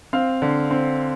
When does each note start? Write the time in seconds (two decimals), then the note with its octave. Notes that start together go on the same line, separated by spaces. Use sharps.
0.13 C4 F5
0.42 D3
0.71 C4